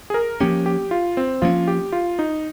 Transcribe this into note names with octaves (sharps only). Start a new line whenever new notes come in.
G#4
A#4
F3 A#3 C#4 G4
G4
F4
C4
F3 A#3 C#4 F4
G4
F4
D#4